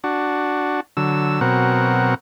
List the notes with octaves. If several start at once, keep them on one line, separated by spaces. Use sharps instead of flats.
D4 F#4
D3 F#3 E6
B2 F#3 C4 A#4 F#5